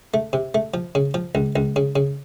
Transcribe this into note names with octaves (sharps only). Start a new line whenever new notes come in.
A3
C3
A3
F3
C#3
F3
C#2
C#2
C#3
C#3